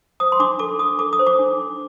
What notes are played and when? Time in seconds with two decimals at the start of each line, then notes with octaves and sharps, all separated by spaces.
0.20 C5 D#6
0.32 C6
0.40 D4 D6
0.59 A4 D6
0.79 D4 D#6
0.99 A4 D6
1.13 D#6
1.19 C5
1.27 D6
1.39 D4
1.59 D4